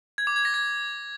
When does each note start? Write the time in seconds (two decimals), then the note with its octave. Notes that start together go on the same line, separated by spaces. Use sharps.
0.18 G#6
0.27 D6
0.36 G#6
0.45 A#6
0.54 G#6